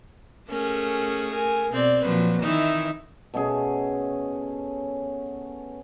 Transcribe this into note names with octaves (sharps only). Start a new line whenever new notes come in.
A3 C#4 G#4 A#4
A#4 G#5
B2 C4 D5
A#2 F3 F#3 B4
D#3 E3 D#4 E4 E5
B2 A3 C#4 G#4